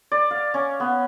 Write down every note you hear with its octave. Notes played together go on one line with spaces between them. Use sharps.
D5
F5
C#4
B3